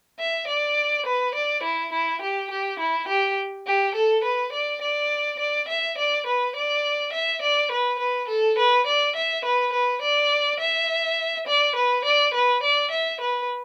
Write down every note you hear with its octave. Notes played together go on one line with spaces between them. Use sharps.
E5
D5
B4
D5
E4
E4
G4
G4
E4
G4
G4
A4
B4
D5
D5
D5
E5
D5
B4
D5
E5
D5
B4
B4
A4
B4
D5
E5
B4
B4
D5
E5
D5
B4
D5
B4
D5
E5
B4